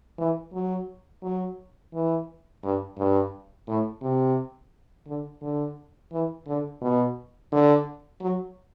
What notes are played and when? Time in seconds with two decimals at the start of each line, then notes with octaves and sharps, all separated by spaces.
0.18 E3
0.53 F#3
1.23 F#3
1.93 E3
2.63 G2
2.98 G2
3.67 A2
4.02 C3
5.07 D3
5.42 D3
6.12 E3
6.47 D3
6.82 B2
7.52 D3
8.21 F#3